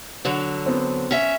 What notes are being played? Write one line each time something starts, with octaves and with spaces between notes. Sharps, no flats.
D3 F#3
B3 C4
C#4 E5